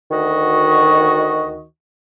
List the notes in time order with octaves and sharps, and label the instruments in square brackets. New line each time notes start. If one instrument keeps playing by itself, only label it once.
[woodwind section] D2 D#3 F#4 D#5 C#6